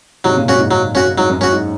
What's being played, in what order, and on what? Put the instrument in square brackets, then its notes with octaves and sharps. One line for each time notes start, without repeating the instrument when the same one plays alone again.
[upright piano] G#2 C3 [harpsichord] F#3
[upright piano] A#2 C#3
[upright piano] F#2 A#2 [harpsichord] C#4 F#4
[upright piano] G#2
[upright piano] G#2 [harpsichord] F#3
[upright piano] F#2 [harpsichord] C#4 F#4
[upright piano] G#2 [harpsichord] F#3
[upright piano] F#2
[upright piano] F#2 [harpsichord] C#4 F#4
[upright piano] G#2